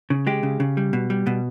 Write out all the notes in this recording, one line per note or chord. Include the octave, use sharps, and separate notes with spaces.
C#3
G#3 G4
C#3
C#3
G3
B2
G3
B2